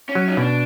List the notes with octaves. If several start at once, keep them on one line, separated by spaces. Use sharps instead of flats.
C#4
F#3
D#4
B2 D4